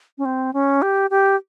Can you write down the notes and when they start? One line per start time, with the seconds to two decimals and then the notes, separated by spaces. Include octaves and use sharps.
0.18 C#4
0.25 C4
0.54 C#4
0.82 G4
1.10 G4